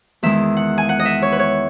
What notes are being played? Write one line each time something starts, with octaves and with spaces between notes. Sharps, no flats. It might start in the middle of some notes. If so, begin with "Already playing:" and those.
E2 D#3 G#3 E5
F#5
G#5
F#5
D#5
E5
C#5
B4
C#5